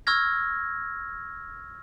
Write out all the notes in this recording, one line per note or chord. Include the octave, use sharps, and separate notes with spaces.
C#6 E6 F6 G#6 A#6